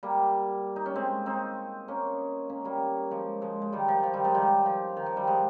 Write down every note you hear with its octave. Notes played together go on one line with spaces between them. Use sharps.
G3 A#3
D#4
C#4
G#3 C4
C4 D#4
A#3 C#4
A#3 C#4
G3 A#3
F3 G#3
F3 G#3
G#3
D#3 G3
F3
F3
D#3 G3
F3 G#3
D#3 G3
F3
D#3
F3
D#3 G3
F3 G#3